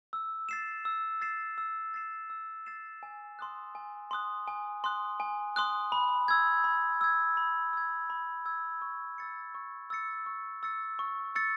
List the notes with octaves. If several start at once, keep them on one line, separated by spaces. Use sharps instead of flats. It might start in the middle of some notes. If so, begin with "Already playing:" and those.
E6
A6 C7 E7
E6
A6 C7 E7
E6
A6 C7 E7
E6
A6 C7 E7
G#5
C6 D#6 F#6
G#5
C6 D#6 F#6
G#5
C6 D#6 F#6
G#5
C6 D#6 F#6
B5
E6 G#6
B5
E6 G#6
B5
E6 G#6
B5
E6 G#6
C#6
E6 A6 C#7
C#6
E6 A6 C#7
C#6
E6 A6 C#7
C#6
E6 A6 C#7